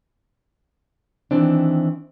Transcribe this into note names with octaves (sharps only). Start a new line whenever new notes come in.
D#3 E3 C4 D4